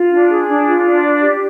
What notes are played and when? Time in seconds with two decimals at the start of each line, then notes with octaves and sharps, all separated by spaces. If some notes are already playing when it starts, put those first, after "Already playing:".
Already playing: F4
0.11 D4
0.29 G#4
0.48 D4
0.66 F4
0.84 D4
1.03 D5
1.21 G4